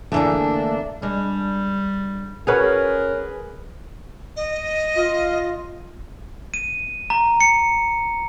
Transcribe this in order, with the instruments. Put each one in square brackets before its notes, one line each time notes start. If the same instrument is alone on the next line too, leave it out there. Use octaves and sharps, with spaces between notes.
[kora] D3 E3 G#4 [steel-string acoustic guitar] A3 A#3 E5 [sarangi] D4
[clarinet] G3 [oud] G#3 D4
[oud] C#4 F#4 C#5 [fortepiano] G#4 B4 [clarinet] A#4
[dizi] D#5
[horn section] F4
[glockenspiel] D#7
A#5
C#7